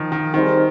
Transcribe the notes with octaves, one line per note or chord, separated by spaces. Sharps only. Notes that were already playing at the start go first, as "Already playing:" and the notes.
Already playing: D#3 F3
D#3
D#3 G3 C4 D#4 G#4 C5